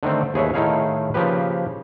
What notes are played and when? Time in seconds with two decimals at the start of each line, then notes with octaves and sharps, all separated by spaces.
0.03 D3 D#3 A3 C4
0.34 D#2 G#4 B4 C#5 E5
0.54 A2 D#3 D#4 E4 G#4 F5
1.14 C#3 F3 A#3 G4 B4